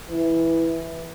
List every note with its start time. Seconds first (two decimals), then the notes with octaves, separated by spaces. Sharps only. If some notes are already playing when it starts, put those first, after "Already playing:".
0.11 E3